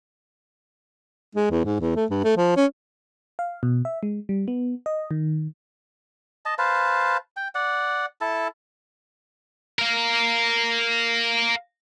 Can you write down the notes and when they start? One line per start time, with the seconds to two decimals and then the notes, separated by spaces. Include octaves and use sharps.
1.35 G#3
1.51 E2
1.65 G#2
1.81 E2
1.96 A3
2.10 G2
2.24 A3
2.37 F3
2.56 C#4
3.39 F5
3.63 B2
3.85 E5
4.03 G#3
4.29 G3
4.48 B3
4.86 D#5
5.11 D#3
6.46 D#5 A5
6.59 B4 C5 F5 A5
7.37 G5
7.55 D5 F#5
8.21 E4 A4 A5
9.79 A#4 F5